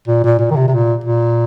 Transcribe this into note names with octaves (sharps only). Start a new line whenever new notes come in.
A#2
A#2
A#2
D#3
C3
C3
A#2
A#2